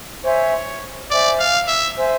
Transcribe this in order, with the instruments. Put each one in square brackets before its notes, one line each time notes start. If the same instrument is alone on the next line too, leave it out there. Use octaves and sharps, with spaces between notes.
[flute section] C5 E5 G#5 [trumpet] C#5
[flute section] C5 E5 G#5 [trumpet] D5
[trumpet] F5
E5
[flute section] C5 E5 G#5